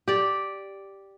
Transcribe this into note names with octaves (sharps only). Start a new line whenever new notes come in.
G4 D5